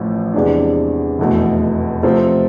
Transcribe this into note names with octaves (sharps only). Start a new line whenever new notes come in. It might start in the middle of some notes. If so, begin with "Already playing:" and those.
Already playing: A1 A2 F3
E2 C3 G#3 D4
F1 E2 B2 A3
C3 F3 A3 C4